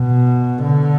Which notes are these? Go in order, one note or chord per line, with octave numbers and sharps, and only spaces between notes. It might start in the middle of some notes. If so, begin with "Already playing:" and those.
Already playing: B2
D3